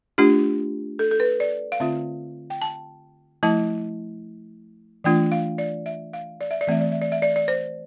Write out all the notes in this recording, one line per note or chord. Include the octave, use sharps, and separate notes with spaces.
A3 D4 F4 G4
A4
A4
B4
D5
F5
D3 A3 C4 F4 E5
G5
A5
F3 A3 E4 A5
E3 A3 D4 F4 G5
F5
D5
E5
F5
D5
E5
D5
E3 A3 C4 E5
D5
E5
D5
E5
D5
D5
C5